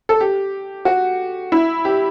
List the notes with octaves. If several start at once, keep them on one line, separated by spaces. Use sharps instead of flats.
A4
G4
F#4
E4
G4